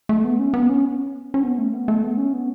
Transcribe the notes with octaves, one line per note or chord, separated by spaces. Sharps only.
A3
B3
C#4
B3
C#4
C#4
B3
A3
B3
A3
B3
C#4
B3